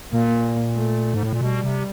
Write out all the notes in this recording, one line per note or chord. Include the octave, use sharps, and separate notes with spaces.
A#2 A#3
A3
G#2
A2
A#2
B2 G3
C3